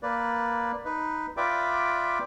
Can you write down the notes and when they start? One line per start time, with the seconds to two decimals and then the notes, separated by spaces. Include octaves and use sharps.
0.03 A#3 B4 D5
0.85 D#4 B4
1.37 F4 B4 D5 E5 G5 D6